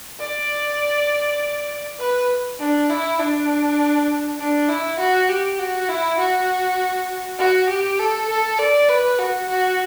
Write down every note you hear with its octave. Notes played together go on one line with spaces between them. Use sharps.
D5
B4
D4
E4
D4
D4
E4
F#4
G4
F#4
E4
F#4
F#4
G4
A4
A4
D5
B4
F#4
F#4